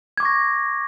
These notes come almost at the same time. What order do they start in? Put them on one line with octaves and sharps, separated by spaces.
G#6 D6 C#6 A#6